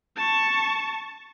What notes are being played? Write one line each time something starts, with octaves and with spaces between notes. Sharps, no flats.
A5 C#6